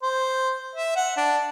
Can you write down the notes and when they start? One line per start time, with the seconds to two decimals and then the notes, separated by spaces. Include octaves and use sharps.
0.03 C5
0.76 E5
0.96 F#5
1.17 D4